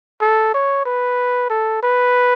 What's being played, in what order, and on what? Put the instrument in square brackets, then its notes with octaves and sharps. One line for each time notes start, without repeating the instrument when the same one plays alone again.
[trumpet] A4
C#5
B4
A4
B4